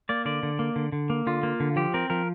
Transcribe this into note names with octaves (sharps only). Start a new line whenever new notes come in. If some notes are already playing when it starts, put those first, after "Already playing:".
A#3 D5
D3 D5
D3
A#3
D3
D3
A#3
D3 F4
A#3
D3
F3 G4
C4 A#4
F3 A#4